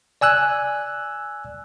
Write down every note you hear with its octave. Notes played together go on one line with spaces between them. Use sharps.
D5 G#5 E6 F#6